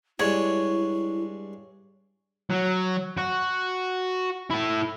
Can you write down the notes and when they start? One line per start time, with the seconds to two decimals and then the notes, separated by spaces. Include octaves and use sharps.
0.19 G2 G#3 D4 E4 C#5
2.50 F#3
3.18 F#4
4.50 E4 A4